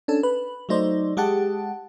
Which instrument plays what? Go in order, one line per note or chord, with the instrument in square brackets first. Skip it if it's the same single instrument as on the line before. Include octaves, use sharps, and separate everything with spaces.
[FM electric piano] C#4 D4 A4
B4
F#3 A3 D#4 C5 D5
G#3 G4 F#5 A5